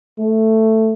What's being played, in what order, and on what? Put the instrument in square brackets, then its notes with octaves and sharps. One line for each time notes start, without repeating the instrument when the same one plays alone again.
[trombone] A3